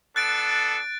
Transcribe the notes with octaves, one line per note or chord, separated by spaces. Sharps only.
B3 D4 A4 F#6 A6 D7